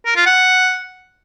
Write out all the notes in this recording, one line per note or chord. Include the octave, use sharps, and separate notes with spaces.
A#4
F4
F#5